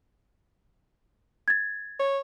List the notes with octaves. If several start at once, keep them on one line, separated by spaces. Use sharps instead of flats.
G#6 A6
C#5